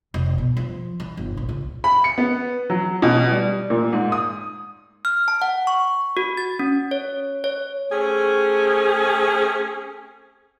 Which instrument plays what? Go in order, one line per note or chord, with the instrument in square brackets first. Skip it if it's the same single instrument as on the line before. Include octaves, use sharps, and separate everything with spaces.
[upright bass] F1
B2
F3
E3
G1
A#1
C#2
[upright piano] B5
C#7
B3
F#3
B2
G3
A#2
G#2
D#6
[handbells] F6
A5
F#5
C#6
F#4
A6
C#4
C#5
C#5
[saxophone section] A3 C4 C#4 G4 G#4